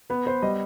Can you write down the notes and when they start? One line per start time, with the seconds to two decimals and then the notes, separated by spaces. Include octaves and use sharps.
0.10 B3 B4
0.26 B3 C5
0.42 G3 D#5